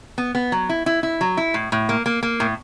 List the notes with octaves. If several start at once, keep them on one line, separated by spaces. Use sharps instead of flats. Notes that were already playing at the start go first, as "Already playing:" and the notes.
B3
B3
F#3
E4
E4
E4
F#3
E4
A2
A2
A#3
A#3
A#3
A2